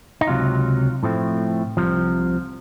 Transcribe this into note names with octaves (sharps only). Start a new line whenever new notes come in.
D#4
C#2 C3 F#3 F4
A2 F3 A3 C4
C2 C3 F3